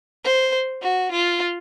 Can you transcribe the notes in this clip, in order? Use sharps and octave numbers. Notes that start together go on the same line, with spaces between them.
C5
F#4
F4